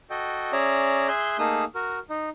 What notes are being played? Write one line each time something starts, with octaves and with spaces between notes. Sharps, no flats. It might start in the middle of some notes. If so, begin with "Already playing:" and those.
F#4 A4 D#5 G5
C#4 G#4 D5 E5 A#5
G#4 E5 G#5 C6 F#6 G6
A3 A#3 D#4 G#4 D#6 E6
F#4 A#4
D#4